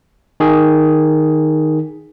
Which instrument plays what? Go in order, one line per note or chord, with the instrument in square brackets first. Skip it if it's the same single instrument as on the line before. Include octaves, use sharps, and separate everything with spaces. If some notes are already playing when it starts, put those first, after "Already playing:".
[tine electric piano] D#3 G#4